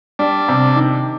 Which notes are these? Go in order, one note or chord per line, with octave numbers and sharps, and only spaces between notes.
G3 D4
C3
D#3